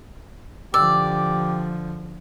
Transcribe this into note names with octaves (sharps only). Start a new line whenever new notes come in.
D3 F3 G4 D5 E6